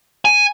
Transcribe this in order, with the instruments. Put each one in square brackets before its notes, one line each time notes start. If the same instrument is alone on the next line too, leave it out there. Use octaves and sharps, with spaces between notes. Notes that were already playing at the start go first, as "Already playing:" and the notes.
[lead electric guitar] G#5